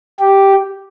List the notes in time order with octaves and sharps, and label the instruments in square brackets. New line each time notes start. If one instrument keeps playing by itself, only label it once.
[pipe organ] G4